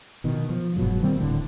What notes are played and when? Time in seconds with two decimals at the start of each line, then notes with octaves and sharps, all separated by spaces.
0.24 B2 D#3
0.50 F3
0.77 F#1 G#2 B2 F#3
1.02 D#3 G3 A#3 C4
1.20 D1 A2 D3